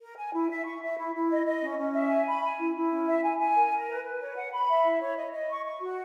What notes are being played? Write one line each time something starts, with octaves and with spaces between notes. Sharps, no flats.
A#4
G#5
E4
E5
C#6
E5
E4
E4
D#5
D#5
C#4
C#4
E5
G#5
B5
G#5
E4
E4
C#4
E5
G#5
G#5
A#4
A#4
B4
B4
C#5
F#5
B5
E5
E4
C#5
D#5
D#5
C#6
C#6
F#4